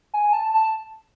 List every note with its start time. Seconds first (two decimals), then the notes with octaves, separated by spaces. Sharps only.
0.14 G#5
0.33 A5
0.54 A5